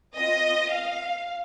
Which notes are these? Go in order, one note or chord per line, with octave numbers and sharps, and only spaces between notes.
C4 F4 D#5
F5